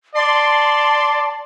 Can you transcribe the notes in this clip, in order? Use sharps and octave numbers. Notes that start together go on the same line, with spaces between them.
D5 A5 C6